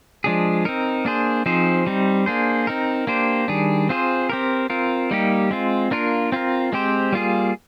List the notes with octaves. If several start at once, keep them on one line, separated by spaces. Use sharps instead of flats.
F3 G#3 D4 G#4
C4 D#4 A#4
A#3 D4 G#4 C5
F3 C4 D#4 G#4 C5
G3 C4 D#4
A#3 D4 G#4 C5
C4 D#4 A#4
A#3 D4 G4 C5
D#3 G3 D4 G#4
C4 F4 G#4 C5
C4 G4 A#4
C4 F4 A#4
G3 A#3 D#4 G4
G#3 C4 F4
A#3 D4 F4 A#4
C4 F4 A#4
G#3 C4 G4 C5
G3 A#3 F4 G#4